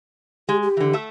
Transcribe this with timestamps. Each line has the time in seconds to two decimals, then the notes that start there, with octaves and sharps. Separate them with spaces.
0.49 G#3 G4
0.63 G4
0.77 D3 E3
0.93 A3 E5